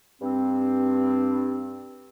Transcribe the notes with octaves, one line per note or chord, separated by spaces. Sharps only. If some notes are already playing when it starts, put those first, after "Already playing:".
G2 C4